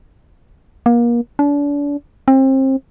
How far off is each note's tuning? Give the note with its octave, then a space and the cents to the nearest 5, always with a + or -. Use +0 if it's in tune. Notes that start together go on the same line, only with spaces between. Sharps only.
A#3 +30
D4 -35
C4 +30